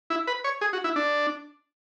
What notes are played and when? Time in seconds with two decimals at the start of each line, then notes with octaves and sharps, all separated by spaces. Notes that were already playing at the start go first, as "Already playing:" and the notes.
0.10 E4
0.27 B4
0.44 C#5
0.61 G#4
0.73 F#4
0.84 E4
0.96 D4